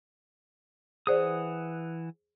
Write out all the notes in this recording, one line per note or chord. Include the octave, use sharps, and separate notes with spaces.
E3 G#4 C5 D5 F#5 D#6